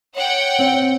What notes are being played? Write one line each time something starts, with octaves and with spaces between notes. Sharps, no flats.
C#5 F#5 G5
C4